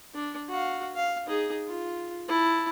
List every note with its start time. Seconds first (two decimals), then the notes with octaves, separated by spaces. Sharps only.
0.15 D4
0.49 F#4 F5
0.95 F5
1.27 D#4 G#4
1.68 F4
2.28 E4 A5